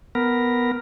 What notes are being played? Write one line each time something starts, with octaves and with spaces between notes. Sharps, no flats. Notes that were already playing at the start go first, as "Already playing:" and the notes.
B3 A#4